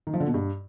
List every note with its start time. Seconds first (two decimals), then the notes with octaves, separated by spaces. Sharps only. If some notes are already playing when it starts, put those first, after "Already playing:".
0.07 D#3
0.14 F3
0.20 D3
0.27 B2
0.34 G2